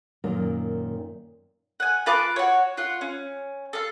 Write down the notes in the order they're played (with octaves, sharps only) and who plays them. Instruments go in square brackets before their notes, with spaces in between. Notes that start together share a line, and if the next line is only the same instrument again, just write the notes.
[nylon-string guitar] F#2 A#2 D#3 A#3
[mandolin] F#5 G#5
F4 B4 A5 D6
F#4 C#5
F4 F#5
C#4
A4 F5